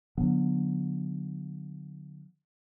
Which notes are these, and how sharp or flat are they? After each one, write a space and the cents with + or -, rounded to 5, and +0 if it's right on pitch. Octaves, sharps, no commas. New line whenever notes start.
D3 +0 F#3 -30 B3 -10